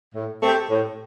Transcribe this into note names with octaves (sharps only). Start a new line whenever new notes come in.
A2
A3 C4 G4
A2